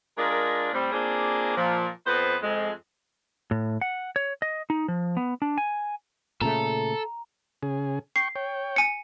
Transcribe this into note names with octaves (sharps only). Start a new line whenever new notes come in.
G#3 D4 F4 A#4
A2 G3 C4
A#3 C4 D4 F4 G#4
A#2 F3
F2 B3 B4 C5
F2 G#3
A2
F#5
C#5
D#5
D#4
F3
B3
D4
G#5
A#2 C#3 A3 A4 A#5
C#3 G#4
G5 C#6 C7
C#5 G5
G#5 C#7